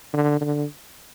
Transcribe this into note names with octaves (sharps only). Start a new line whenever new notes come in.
D3
D3